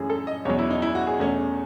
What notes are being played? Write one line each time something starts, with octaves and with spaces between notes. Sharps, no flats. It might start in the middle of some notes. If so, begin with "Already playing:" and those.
Already playing: F#2 E3 A3 C#4 G#4
A4
D#5
E2 B2 F#3 C#5
E4
D#4
E4
F#4
G#4
E2 B2 A3 C#4